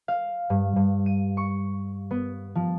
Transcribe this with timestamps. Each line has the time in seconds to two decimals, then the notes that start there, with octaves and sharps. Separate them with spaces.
0.08 F5
0.50 G2
0.76 G2
1.06 D#7
1.37 C#6
2.11 B3
2.55 F3